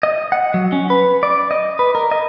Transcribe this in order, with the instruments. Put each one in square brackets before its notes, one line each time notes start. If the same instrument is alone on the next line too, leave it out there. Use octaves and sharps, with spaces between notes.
[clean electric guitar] D#5
F#5
F#3
C#4
B4
D5
D#5
B4
A#4
D#5